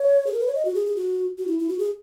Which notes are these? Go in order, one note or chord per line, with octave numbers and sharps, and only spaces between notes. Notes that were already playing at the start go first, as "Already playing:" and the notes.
Already playing: C#5
G#4
A#4
B4
C#5
D#5
F#4
G#4
G#4
F#4
F#4
E4
E4
F#4
G#4